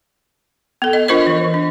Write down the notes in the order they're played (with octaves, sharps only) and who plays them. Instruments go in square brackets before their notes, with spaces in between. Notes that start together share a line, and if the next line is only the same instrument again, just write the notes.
[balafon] B3 A4
D#5
D4 F4 A#4 C5 D#5
E3
D4